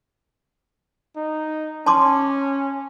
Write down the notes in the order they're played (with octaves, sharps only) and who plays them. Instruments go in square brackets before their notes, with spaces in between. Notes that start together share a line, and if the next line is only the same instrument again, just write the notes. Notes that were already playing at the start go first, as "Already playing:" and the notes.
[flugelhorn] D#4
[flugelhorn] C#4 [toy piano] A5 C6 D6